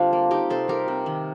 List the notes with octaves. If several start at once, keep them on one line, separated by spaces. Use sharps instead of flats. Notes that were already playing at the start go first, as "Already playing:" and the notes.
Already playing: D3 G3 C4 D4 F4
A#3
A#3 D#4 G4
C3 A4 C5
G3 G4 A#4
C3
D#3